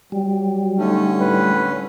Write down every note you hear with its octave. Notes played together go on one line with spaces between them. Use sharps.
F#3 G3
D3 A3 C#4 D#4
A2 B4